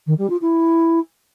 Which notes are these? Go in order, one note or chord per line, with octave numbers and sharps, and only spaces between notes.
D#3
G3
F4
E4